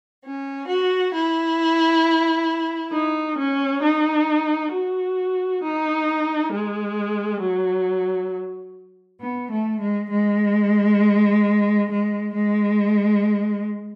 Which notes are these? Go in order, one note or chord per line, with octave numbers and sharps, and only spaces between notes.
C#4
F#4
E4
D#4
C#4
D#4
F#4
D#4
G#3
F#3
B3
A3
G#3
G#3
G#3
G#3